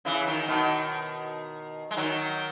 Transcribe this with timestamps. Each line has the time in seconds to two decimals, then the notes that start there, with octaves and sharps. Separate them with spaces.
0.05 C#3 E3
0.27 D#3 F#3
0.48 B2 D#3
1.91 G#3
1.97 D#3 F#3